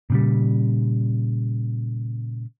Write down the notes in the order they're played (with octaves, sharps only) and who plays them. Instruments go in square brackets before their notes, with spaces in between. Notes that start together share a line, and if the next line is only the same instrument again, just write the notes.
[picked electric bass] A#2 C#3 G3